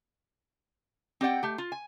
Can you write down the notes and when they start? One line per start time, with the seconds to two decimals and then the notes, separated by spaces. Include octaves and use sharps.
1.21 C4 G4 D5 F#5 G5
1.43 A3 G4
1.58 F4
1.72 G#5